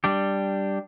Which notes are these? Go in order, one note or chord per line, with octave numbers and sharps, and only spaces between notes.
G3 D4 G4